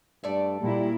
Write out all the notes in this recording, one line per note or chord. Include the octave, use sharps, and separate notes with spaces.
G2 A3 A4 D5
A#2 G3 E4